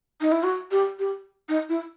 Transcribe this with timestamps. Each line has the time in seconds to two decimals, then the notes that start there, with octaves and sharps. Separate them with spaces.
0.21 D#4
0.32 E4
0.43 F#4
0.72 G4
0.99 G4
1.49 D#4
1.69 E4